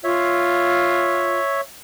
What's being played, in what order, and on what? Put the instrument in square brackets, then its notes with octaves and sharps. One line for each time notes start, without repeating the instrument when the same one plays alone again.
[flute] F4 [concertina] C#5 E5